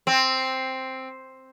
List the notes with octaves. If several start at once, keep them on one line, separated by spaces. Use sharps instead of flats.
C4